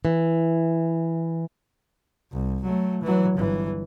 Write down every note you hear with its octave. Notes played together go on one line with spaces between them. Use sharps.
E3
C2
F#3 A3
E3 F#3
G1 E3